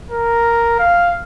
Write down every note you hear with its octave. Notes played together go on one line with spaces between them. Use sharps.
A#4
F5